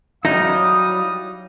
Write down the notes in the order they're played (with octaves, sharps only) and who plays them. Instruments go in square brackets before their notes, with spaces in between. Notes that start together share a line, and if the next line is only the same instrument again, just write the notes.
[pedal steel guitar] F#3 [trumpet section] G3 F5 D#6 [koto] D#4 [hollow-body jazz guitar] E4